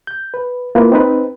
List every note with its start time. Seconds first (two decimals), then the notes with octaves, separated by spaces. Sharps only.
0.07 G6
0.34 B4
0.75 A#3 E4 F4 B4
0.92 C4 D#4 B4